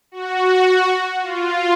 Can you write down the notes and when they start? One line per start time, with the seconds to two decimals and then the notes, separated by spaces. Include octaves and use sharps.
0.12 F#4
1.22 F4